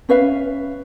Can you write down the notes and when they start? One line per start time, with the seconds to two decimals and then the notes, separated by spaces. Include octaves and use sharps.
0.09 C#4 B4 E5 F5